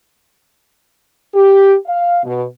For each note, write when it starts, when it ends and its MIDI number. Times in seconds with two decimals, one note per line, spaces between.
1.33 1.73 67
1.86 2.19 77
2.23 2.43 47